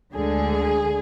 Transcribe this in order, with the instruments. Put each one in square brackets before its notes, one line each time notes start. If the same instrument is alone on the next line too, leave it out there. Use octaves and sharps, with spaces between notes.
[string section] D2 D3 G#3 G#4